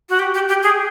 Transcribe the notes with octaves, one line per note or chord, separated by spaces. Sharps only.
F#4
G4
G4
G4
G#4